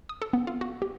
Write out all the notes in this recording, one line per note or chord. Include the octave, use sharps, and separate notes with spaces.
D#6
A4
B3
F4
F#4
G4